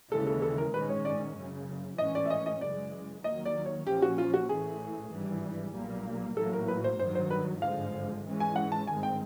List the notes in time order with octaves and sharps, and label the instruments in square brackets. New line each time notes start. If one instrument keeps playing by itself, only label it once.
[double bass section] D#2 C#3 E3 G#3 [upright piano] A4
[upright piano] A4
A4
A#4
[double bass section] A#1 G#2 D#3 G#3 C#4 [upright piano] B4
[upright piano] C#5
D5
[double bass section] F#1 F#2 C#3
[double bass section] A1 G#2 E3 A3 C#4 [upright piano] D#5
[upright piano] D5
E5
D#5
D#5
[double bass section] F#2 C#3 E3 G#3 [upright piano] D5
[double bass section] F1 D#2 D#3 F#3 A#3 [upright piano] D#5
[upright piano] D5
C#5
[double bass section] A#1 A#2 F3 A#3 C#4 [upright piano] G4
[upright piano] F#4
F4
F#4
[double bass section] A1 A2 E3 A3 [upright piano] G#4
[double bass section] G#1 G2 E3 G3
B1 A#2 G3 A#3
[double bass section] A1 A2 F#3 A#3 [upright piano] A4
[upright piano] A#4
B4
C5
[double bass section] G2 D#3 F#3 [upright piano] C5
[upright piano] C5
B4
[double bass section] G#1 G2 D3 F3 G#3 [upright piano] F5
[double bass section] G#2 E3 G#3 C#4
[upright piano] G#5
F#5
A5
[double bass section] G#1 G2 D#3 G#3 C4 [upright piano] G#5
[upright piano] G5